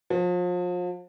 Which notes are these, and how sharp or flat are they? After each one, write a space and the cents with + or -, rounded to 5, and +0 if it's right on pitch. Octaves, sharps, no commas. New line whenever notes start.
F3 +35